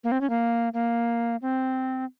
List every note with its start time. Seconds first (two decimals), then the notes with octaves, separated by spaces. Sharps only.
0.04 A#3
0.12 C4
0.21 C#4
0.30 A#3
0.74 A#3
1.42 C4